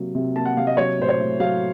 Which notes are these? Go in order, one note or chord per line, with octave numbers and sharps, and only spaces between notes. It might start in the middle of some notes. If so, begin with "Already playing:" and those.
Already playing: C3 F#3 A#3
C3
A#3 A5
F#5
C3 F5
D#5
F#3 C#5
A2 C5
C#5
A2
F#3 F5